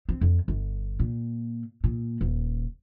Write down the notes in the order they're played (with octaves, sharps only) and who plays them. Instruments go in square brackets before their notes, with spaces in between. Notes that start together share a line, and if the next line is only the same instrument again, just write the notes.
[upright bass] C4
F2
G1
A#2
A#2
D#1